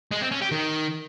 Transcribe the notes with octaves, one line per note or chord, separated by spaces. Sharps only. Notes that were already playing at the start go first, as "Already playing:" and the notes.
G#3
C4
C#4
G4
D#3